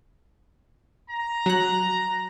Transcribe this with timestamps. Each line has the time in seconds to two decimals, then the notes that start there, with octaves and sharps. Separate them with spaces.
1.10 A#5
1.46 F#3 F#6